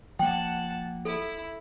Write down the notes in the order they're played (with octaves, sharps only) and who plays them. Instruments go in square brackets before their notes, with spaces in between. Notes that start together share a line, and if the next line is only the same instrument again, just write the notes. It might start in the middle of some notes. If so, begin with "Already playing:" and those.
[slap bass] F3 A#3 [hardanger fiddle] F#5 A5 [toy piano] G5
[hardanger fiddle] E4 [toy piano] A4